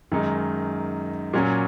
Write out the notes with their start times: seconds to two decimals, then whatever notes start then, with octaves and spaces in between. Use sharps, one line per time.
0.12 F#2 D#3 G#3 D#4
1.33 A#2 F#3 C#4